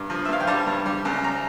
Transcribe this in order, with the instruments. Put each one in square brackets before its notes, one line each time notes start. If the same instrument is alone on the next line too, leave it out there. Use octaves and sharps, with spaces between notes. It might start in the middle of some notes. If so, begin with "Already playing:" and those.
Already playing: [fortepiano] G2
F3
E5
G2 F5
G5
G3 A5
G2
G3
C#2
A#5